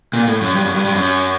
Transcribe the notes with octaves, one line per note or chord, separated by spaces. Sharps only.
A#2
A2
F#2
G2
F#2
G2
G2
F#2